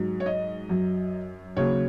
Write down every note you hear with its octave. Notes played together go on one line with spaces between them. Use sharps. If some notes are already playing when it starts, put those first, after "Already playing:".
Already playing: G#2 F#3
C#5
D#5
F#2 F#3
D#2 C#3 F#3 C#5